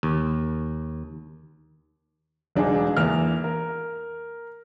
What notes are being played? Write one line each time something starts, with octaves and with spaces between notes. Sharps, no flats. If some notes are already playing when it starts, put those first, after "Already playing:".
D#2
E1 D4 D#4 G#4
E2 A#3 F6
A#4